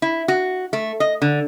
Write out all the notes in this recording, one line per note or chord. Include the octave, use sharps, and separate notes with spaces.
E4
F#4
A3
D#5
D3